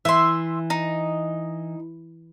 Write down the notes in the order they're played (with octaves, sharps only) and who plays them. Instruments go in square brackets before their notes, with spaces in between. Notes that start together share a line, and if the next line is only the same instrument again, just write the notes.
[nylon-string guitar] E3 [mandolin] E5 C6
[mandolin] D#4